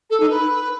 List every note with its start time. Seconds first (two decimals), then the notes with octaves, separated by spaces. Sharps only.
0.10 A4
0.20 D#4
0.30 B4